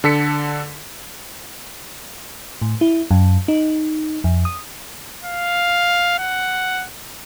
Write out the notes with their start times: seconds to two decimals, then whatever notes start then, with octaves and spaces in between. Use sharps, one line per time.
0.04 D3 A4 B6 C#7
2.62 A2
2.81 E4
3.11 F#2
3.48 D#4
4.24 F2
4.45 D#6
5.25 F5
6.18 F#5